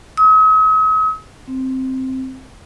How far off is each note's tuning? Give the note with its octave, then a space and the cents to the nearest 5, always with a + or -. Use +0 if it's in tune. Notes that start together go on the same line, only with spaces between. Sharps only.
D#6 +45
C4 +0